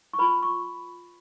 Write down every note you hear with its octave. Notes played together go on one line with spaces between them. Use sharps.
C#6
F4 B4 B5
C#6